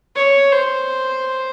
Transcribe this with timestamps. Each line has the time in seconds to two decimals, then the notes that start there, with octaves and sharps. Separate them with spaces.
0.16 C#5
0.52 C5